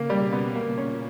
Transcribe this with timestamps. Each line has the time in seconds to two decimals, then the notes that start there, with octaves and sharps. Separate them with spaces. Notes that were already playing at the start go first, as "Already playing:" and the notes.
Already playing: C#3 A#3
0.10 B2 G3
0.32 B3
0.55 A#2 A#3
0.78 C#4